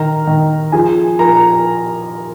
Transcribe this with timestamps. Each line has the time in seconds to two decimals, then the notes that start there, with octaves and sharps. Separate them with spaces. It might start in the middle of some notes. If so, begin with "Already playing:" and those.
Already playing: D#3 A#4 A#5
0.27 D#3
0.72 F3 G#4 G#5
1.19 F3 A#4 A#5